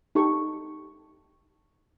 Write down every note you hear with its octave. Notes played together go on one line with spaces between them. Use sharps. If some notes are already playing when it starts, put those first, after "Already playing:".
D#4 G4 A4 C#6